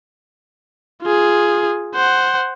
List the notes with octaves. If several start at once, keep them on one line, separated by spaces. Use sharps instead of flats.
F4 G#4
C5 F#5